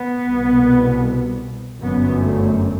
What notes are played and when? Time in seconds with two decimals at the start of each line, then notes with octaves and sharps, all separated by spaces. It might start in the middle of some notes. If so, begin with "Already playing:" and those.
Already playing: B3
0.27 C2 B2
1.81 G1 F#2 B3
2.21 A3